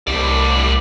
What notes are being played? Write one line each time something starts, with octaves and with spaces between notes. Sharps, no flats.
C2 A2 D5